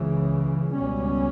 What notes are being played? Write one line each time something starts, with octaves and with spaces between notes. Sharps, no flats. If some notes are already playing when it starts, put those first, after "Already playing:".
Already playing: C#2 C#3 E3
C#2 B2 G3 C#4